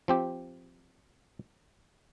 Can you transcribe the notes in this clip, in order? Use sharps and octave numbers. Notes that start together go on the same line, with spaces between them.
F3 C4 G4